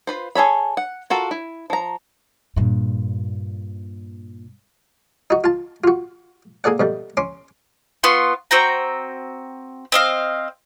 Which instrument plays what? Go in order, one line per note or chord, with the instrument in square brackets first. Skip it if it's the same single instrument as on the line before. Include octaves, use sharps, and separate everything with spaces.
[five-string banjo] F4 B4 C5
G#4 A4 C#5 B5
F#5
F4 F#4 A4 A#4
E4
F3 A#5
[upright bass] G2 A#2
[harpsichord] D#4 F#4
F4 A5
F4 F#4
A#3 G#4 A4 D5 F#5
B2 G3 A3
C#4 C6 D6
[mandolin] B3 F4 C6 C#6
C4 F#4 G5 A#5
C4 D#5 F5